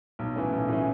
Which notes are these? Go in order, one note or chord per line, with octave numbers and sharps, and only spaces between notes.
B1
A2 E3 A3 C#4
B1
A2 E3 A3 C#4